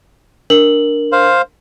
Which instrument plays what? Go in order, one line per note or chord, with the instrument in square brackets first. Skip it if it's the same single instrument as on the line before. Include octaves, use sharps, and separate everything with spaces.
[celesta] D4 A#4 F#7
[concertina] C5 F5